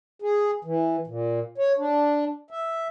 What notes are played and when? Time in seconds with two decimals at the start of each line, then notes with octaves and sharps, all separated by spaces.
0.22 G#4
0.64 E3
1.07 A#2
1.58 C#5
1.78 D4
2.51 E5